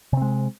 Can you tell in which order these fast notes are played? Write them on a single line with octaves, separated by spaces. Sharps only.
C3 C4 G#3